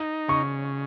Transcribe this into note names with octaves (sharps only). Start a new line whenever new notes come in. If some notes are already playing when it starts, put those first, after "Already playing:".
Already playing: D#4
C#3 C#6